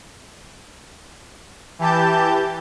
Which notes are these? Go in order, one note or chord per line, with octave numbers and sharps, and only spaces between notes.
E3 G4 A5 G6